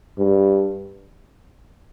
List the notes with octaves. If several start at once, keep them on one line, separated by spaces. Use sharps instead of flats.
G2